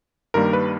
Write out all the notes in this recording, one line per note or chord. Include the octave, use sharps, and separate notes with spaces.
G2 D#3 G3 A#3 A#4
B4